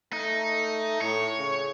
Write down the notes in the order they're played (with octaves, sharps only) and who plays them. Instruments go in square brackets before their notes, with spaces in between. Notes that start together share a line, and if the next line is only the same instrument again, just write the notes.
[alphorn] A3 [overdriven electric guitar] D#4
[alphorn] A2 [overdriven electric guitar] C#5
[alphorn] C#3